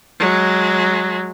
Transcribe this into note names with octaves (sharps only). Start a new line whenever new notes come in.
F#3 G#3